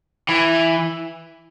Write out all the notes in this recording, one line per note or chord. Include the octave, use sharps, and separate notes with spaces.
E3